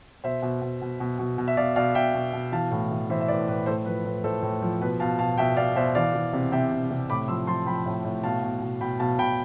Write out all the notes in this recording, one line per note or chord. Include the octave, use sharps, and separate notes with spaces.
B2 C5 E5
B2
B2
B2
B2
B2
B2
E5
B2 D5 F5
B2 D5 F5
B2 E5 G5
B2
B2
E3 F5 A5
A2
E3
E3 C5 E5
E5
A2 B4 D5
A2 B4
A2 A4 C5
F3 B4
A2 B4
A2 A4 C5
A2
F3
B2 B4
B2 F5 A5
B2 F5 A5
B2 E5 G5
B2 D5 F5
B2 C5 E5
E3 D5 F5
E3
C3
C3 E5 G5
C3
C3
A2 B5 D6
F3 C6 E6
F3 A5 C6
F3 G5 B5
A2
A2
B2 F5 A5
B2
B2
B2 G5 B5
B2 F5 A5
B2 G5 B5